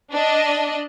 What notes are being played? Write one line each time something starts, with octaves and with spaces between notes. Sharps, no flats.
D4 D#5